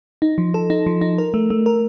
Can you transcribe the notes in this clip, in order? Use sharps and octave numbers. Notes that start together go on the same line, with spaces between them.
D#4
F3
A4
D#4
F3
D#4
A#4
A3
A3
A#4